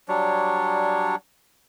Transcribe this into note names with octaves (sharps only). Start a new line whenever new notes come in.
F#3 G3 D4 C#5